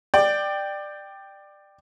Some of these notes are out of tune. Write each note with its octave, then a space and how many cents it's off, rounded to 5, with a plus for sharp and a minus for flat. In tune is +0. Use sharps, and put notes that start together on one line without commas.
D5 +20 G5 +0